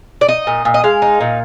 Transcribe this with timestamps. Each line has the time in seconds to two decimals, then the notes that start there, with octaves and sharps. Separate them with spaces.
0.21 D5
0.28 D#4 D#5
0.47 A#2
0.65 A#2
0.74 D#5
0.84 G#3 F5
1.02 D#4
1.21 A#2